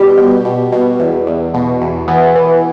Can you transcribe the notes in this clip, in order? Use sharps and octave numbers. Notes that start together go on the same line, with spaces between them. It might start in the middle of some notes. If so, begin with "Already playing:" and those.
Already playing: B2 G3 G4
B2
B2
B2
E2
E2
B2
E2
E3 B3
E3